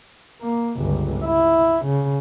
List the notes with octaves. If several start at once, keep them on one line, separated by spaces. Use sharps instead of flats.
A#3
G1 C#2
E4
C#3